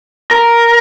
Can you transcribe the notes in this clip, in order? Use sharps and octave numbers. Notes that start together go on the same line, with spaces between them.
A#4